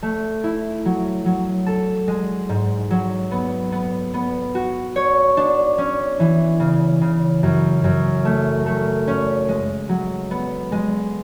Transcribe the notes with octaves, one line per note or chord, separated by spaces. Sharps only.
A3
E4
F#3
F#3
A4
G#3
G#2
F#3
B3
B3
B3
F#4
C#5
D4
C#4
E3
C#3
C#3
F#2
F#2
A3
A3
C#4
G#3
F#3
B3
G#3